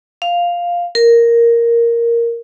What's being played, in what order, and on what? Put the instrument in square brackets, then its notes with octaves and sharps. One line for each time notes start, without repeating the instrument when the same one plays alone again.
[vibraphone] F5
A#4